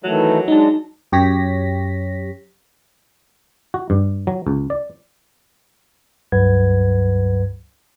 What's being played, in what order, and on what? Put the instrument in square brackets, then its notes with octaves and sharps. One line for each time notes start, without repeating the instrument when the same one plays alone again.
[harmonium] D#3 E3 A3 [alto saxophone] F#3
[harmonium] G#3 D4 [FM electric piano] D#4 A5
[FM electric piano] F#2 G4 C#5 A#6 B6
[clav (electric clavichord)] F#4
G2
F#3
C#2
D5
[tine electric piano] C#2 G2 F#3 B4 F#5 G#6